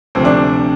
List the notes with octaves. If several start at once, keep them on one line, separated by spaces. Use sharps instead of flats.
D2 C3 F3 C4
D4